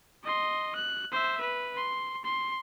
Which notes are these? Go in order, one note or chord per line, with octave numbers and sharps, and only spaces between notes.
D#5 C6
F#6
C5 E5
B4
C6
C6